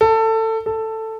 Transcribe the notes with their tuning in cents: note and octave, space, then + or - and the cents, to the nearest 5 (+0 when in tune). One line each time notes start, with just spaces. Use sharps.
A4 +20
A4 +10